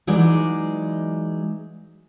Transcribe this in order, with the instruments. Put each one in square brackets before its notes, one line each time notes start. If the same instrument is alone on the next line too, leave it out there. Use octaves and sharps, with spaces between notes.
[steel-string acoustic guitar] E3 F#3 G#3 D#4 D5